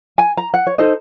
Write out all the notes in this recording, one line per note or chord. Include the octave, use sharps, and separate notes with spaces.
G#5
A#5
F#5
C#5
D#4 A4 C5 D#5